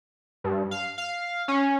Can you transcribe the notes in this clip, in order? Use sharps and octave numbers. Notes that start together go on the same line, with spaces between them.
G2
F5
F5
C#4